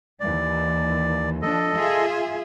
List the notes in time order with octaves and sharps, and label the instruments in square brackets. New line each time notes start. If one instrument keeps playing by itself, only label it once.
[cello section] D#2 E3 [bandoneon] D5
[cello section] F3 D4 [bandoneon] A4 D#5
[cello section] F4 G#4 E5